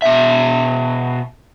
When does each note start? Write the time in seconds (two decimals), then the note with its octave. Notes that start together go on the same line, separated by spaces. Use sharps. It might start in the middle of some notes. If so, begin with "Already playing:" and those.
0.02 B2 E5